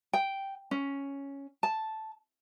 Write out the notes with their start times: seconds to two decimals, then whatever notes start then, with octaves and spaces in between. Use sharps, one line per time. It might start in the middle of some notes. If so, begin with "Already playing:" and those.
0.13 G5
0.71 C#4
1.63 A5